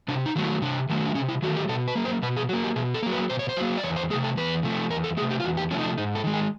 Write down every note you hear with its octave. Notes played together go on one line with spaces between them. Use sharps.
C3 D4
D#4
D#3 F#3 A3
E4
C3 D4
D#3 F#3 A3
D4
C3 C#4
E4
D#3 F#3 A3 F#4
G4
B2 A4
B4
F#3 A#3
C5
B2 B4
G#4
F#3 A#3 F#4
G4
B2 G#4
A4
F#3 A#3
B4
B2 C5
C#5
C5
F#3 A#3
D5
E2 C#5
C5
C3 F3 A3 G#4
A4
E2 B4
C3 F3 A3
E2 A#4
A4
C3 F3 A3 G#4
G4
F4
E2 F#4
G4
C3 F3 A3 C#4
D#4
D4
G#2 D#4
A4
D#3 G#3
G#4